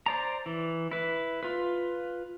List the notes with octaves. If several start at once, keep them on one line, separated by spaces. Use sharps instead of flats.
C5 D5 A#5
E3
E4 B4
F4 B4